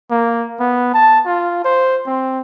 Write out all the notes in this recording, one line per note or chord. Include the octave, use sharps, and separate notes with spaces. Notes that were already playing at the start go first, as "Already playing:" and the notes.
A#3
B3
A5
F4
C5
C4